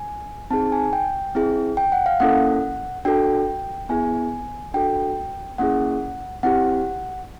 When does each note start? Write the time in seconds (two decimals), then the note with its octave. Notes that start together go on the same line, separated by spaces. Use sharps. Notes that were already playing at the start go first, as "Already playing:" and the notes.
Already playing: G#5
0.50 C4 D#4 G#4 A5
0.72 G#5
0.93 G5
1.35 C4 E4 G#4
1.77 G5
1.92 F#5
2.06 F5
2.20 A#3 C#4 E4 A4 F#5
3.05 D4 F#4 A4 G5
3.89 B3 E4 G#4 G#5
4.74 D4 F#4 A4 G5
5.58 A#3 C#4 E4 G#4 F#5
6.43 C4 E4 G4 F#5